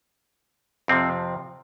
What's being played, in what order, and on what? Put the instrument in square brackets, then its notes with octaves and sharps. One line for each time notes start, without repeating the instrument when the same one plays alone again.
[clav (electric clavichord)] F2 C3 F3 C4